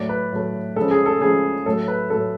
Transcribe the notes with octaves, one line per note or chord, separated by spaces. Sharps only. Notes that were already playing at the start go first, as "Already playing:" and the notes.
Already playing: A2 F#3 A3 D5
B4
A2 F#3 A3
C#3 F3 G#3 A4
G#4
A4
C#3 F3 G#3 G#4
A2 F#3 A3 A4
B4
A2 F#3 A3 A4